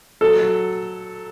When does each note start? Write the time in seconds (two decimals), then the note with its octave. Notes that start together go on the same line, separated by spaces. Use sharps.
0.21 F#3 A4
0.41 F#3